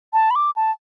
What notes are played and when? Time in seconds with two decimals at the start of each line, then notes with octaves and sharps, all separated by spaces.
0.13 A5
0.31 B5
0.36 D6
0.56 A5